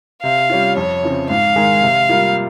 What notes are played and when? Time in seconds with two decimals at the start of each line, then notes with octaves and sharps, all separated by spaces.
0.23 C3 F5
0.50 G3 C#4 F4
0.76 F2 C#5
1.03 C#3 F3 C4
1.30 G#2 F5
1.56 D#3 G#3 D#4 G#4
1.82 C3
2.09 G3 A#3 F4